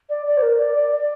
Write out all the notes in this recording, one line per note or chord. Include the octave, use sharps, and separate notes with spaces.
D5
D5
C5
A#4
D5
D5
D5